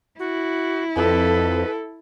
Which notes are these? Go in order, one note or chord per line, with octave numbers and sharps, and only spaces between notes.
E4 F#4
F2 A4 B4